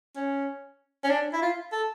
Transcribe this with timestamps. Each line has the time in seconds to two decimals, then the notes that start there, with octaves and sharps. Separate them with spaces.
0.16 C#4
1.04 C#4
1.09 D4
1.33 E4
1.42 F4
1.72 A4